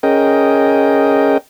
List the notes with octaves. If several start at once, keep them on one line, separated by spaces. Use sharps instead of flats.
C#4 G#4 A#4 D#5 G5